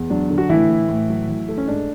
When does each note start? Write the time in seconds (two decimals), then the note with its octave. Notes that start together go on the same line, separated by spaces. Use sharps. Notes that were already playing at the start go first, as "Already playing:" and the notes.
Already playing: E2
0.10 F#3 D4
0.30 D3
0.38 F#4
0.50 A2 E3 E4
0.69 A2
0.88 A2
1.09 F#3
1.28 E3
1.49 A3
1.58 C#4
1.68 G#2 D4